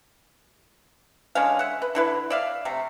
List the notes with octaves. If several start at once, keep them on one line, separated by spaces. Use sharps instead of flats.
D3 G#3 C#4 F5
E5 F#5
B4
D3 E4 B4
D5 E5 F5
C3 A3